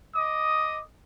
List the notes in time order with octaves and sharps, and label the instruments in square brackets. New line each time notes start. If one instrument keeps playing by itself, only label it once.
[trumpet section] D#5 D6 D#6